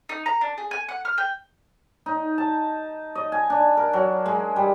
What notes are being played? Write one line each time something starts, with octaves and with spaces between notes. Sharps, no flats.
D#4
A#5
D4
G#4
G#5
F#5
F6
G5
D#4
A5
D#5
G#5
D4
A#4
F#3
G#3
G3